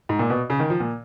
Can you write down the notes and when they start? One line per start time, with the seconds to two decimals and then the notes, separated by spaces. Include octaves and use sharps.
0.09 G#2
0.19 A#2
0.30 B2
0.50 C#3
0.60 D#3
0.70 F3
0.80 A#2